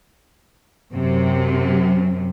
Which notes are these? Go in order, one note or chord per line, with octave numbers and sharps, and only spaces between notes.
F#2 C3